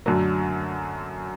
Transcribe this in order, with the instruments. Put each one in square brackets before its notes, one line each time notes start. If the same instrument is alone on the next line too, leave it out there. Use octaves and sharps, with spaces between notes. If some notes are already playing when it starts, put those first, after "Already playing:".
[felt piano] F#2 D3 F#3 A3